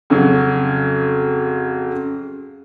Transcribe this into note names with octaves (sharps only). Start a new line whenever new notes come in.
F2 C#3 F#3